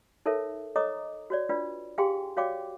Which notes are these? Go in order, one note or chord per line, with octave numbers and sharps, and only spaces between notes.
D#4 A4 A#4 C#5 E5
A4 C#5 D#5 A#5 D6 D#6
F#4 C#5 D5
D4 F4 B4 D5
G4 G#4 F5 G5 G#5 C6
F#4 C#5 D5 F5 G5 D6